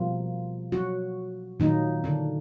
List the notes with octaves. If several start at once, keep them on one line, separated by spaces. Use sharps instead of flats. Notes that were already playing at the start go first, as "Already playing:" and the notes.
Already playing: B2 F3 G3 A#3 F4
F#3 F#4
A#2 D#3 F#3 A#3 D#4
D3 D4